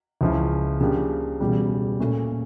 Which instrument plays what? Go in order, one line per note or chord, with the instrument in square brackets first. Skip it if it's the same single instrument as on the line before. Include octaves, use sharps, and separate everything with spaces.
[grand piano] C#2 C#3 F3 C#4 E4
C#3 F3 A#3 D4 G4
E1 E2 C#3 G3
A#2 A3 C#4